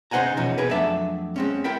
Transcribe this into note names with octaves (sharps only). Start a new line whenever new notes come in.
C#3 D#4 C5 F#5 G#5 A#5
E2 B2 F3 C#4 D#4
D#4 G#4 A#4 B4
F2 F#3 A3 D4 E5 A5
G#3 C4 C#4
E4 A#4 G5 B5